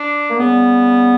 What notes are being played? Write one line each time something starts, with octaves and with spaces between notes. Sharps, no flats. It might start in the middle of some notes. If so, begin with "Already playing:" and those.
Already playing: D4
A#3
C#3 G3 B3